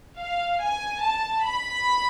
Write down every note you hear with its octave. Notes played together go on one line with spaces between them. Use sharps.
F5
G#5
A5
B5